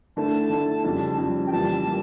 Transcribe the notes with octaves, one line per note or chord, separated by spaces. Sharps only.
D3 A3 E4 A5
D3 A3 E4
F2 C#3 G3
F2 C#3 G3
G5
F2 E3 G3 A#3 A5
G3 A#3